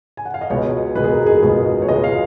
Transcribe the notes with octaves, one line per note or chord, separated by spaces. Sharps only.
G#5
F#5
F5
D#5
C#2 B2 G#3 B3 C#5
C#2 B2 G#3 B3 B4
G#4
A#4
G#4
C#2 B2 G#3 B3
C#5
C#2 B2 G#3 B3 D#5
F5